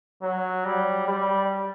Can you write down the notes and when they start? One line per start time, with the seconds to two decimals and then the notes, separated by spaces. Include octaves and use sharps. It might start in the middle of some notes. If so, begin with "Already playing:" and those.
0.22 F#3
0.65 G3
1.07 G3